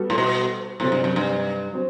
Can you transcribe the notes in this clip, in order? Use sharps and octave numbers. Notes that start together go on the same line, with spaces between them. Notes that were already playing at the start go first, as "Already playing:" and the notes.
Already playing: G3 B3 F#4 A4
A2
B2
A2 C3 F#3 C4
G2
F#2
G2
F#3 C4